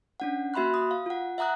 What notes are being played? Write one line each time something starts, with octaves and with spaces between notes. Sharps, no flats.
C#4 D4 F#5
A#3 F#4 E5 B5 C6 F#6
D#6
F5
F4 F#5
E5 F#5 A#5 D#6 F#6